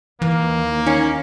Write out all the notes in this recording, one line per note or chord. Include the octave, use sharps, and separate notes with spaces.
D#2 E3 A#3
C#4 D#4